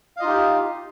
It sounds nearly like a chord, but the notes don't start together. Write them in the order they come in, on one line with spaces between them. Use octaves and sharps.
F5 D#5 F4 D#4 G4